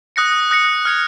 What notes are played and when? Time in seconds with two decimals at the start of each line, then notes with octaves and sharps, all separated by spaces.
0.16 D#6 F#6 A#6 C#7
0.51 D#6 F#6 A#6 C#7
0.85 F6 G#6 C#7 F7